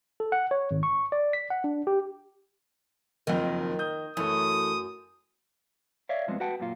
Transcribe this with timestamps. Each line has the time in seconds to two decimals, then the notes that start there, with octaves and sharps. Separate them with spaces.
0.20 A4
0.32 F#5
0.51 C#5
0.71 G#1
0.83 C#6
1.12 D5
1.33 B6
1.50 F#5
1.64 D4
1.87 G4
3.27 F#1 F2 D#3
3.79 D#6 G6
4.17 F#2 E3 A3 D#6
6.09 C#5 D5 E5 F5
6.28 G2 F3 G#3 B3 C4
6.40 F#4 B4 F#5 G5 A5
6.60 F#2 A#2 F4